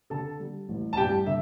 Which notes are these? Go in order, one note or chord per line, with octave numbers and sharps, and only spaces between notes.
D3 A4 A5
G3
A1
A5
G2 G4 G5
D3 E5